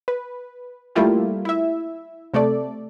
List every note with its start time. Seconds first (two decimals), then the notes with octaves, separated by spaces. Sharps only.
0.08 B4
0.95 G3 A3 A#3 E4 F4 G4
1.45 E4 E5
2.34 C3 A3 A4 D5